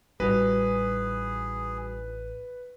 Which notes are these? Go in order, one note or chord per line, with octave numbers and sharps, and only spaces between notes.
A1 G3 D#4 F#4 G#4 B4